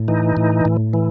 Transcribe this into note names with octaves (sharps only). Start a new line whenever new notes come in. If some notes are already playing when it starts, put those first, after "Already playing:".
Already playing: A2
E3 D#4
A2
A2
E3